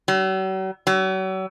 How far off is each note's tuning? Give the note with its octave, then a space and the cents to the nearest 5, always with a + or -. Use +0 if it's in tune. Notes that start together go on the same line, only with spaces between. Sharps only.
F#3 +45
F#3 +40